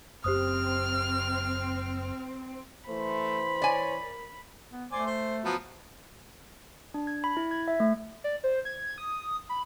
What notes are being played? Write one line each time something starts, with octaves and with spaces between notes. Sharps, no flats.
F#1 F#2 C4 C#4 G4 C5 D#6 F6
E3 A3 C5 B5
C#5 D5 G#5
A#4
B3
A3 C5 D5 G#5
C5
F3 F#3 B3
D4
G#6
B5
E4
G#6
E5
A3
D5
C5
G#6
D#6
B5